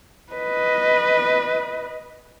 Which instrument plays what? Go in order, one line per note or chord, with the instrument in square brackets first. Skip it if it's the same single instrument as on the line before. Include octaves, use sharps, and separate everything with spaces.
[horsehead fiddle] B4 D#5